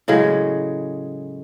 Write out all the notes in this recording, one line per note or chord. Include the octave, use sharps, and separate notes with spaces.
A2 C#3 F#3 G#3